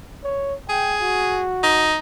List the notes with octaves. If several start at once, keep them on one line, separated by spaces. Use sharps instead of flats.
C#5
G#4 G5
F#4
D#4